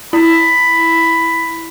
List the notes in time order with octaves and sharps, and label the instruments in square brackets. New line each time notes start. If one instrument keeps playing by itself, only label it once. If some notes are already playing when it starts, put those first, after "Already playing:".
[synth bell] E4 [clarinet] B5